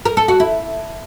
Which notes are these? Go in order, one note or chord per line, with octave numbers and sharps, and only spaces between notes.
A#4
A4
F#4
E4